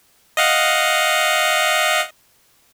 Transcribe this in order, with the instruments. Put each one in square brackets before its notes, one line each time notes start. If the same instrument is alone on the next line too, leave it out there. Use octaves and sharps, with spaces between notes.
[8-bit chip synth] D#5 F5 F#5